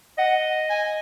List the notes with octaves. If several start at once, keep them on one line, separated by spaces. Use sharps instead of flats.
D#5 F#5
G#5